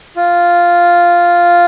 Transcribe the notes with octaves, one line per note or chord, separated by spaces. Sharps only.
F4